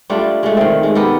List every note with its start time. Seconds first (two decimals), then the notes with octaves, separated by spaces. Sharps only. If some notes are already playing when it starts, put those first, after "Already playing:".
0.10 G3 A3 D4 F4
0.43 G#3 A3
0.57 D#3 C4
0.83 G#3
0.95 B3 G4 A4 A#4